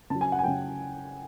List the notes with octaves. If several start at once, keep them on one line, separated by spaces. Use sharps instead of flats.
C#3 F#3 A5
G#5
F#5
G#5
C#3 F#3 G5